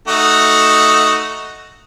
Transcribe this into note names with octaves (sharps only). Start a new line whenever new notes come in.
A3 D#4 F#4